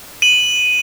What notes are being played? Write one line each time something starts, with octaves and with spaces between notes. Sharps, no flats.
D#7 F#7